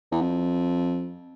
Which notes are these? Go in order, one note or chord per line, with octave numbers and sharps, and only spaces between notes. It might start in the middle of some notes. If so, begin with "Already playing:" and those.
E2
F2